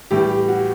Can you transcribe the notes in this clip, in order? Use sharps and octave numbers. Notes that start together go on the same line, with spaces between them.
A2 E3 G3 G4
G4
F#4